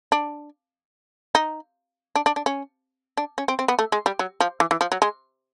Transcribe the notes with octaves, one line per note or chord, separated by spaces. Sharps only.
D4
D#4
D4
D4
D4
C#4
D4
C#4
C4
C4
B3
A3
G#3
G3
F#3
F3
E3
E3
F3
F#3
G#3